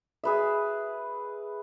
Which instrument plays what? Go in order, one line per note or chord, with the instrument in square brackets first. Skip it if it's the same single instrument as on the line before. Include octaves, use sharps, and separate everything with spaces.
[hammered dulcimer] G#4 B4 E5